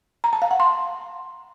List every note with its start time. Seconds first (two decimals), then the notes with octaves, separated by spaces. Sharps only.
0.24 A#5
0.33 A5
0.42 F5
0.51 F#5
0.60 C6